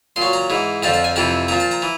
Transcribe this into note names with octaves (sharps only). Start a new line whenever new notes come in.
A#2 C6
F#3
A#5
G#2 E3
F2 D3 F3 A5
A5
G#5
F2 C3 E3 A5
A#2 F3 A#5
A5
A#5
E3